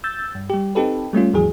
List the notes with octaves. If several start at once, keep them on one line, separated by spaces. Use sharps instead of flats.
E6 G6 A6
G2
G3 G4
C4 D#4 G4 A4 B4
G3 A3 C#4 F4
D#2 G#2 E3 F#3 G#4